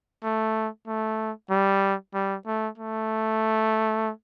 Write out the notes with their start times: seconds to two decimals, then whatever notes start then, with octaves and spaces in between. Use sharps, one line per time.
0.24 A3
0.87 A3
1.50 G3
2.14 G3
2.46 A3
2.77 A3